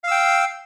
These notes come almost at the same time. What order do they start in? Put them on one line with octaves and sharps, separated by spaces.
F5 E6 G5